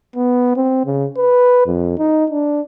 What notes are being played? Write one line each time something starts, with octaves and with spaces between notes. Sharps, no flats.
B3
C4
C#3
B4
F2
D#4
D4